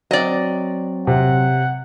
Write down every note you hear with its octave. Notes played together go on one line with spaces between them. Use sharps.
F#3 C4 D5 D#5
C3 F#5